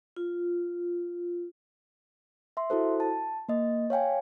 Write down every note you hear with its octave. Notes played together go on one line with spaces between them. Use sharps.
F4
E5 C6
E4 F#4 A4 C5
A5
A#3 D#5
C#5 F5 G5 G#5